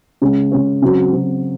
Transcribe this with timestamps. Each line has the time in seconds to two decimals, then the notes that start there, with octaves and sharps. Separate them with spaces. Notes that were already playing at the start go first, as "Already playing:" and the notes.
0.22 C#3 G#3 C#4
0.52 C#3 G#3 C#4
0.82 C#3 F#3 C4
1.12 C#3 F#3 C4